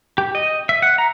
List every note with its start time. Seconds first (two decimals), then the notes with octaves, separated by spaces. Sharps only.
0.18 G4
0.35 D#5
0.69 E5
0.82 F#5
0.98 A#5